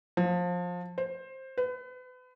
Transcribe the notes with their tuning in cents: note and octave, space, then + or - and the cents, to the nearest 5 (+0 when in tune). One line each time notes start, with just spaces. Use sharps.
F3 +20
C5 +15
B4 +35